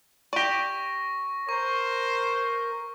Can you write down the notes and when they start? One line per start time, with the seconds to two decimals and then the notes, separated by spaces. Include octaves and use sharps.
0.33 G4 D5 C#6 A#6
1.49 A#4 C5 C#6